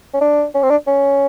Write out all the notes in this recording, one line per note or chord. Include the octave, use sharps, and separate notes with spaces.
C#4
D4
C#4
C4
D4
C#4